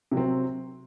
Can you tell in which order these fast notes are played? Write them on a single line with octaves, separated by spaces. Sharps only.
C3 F#3 C4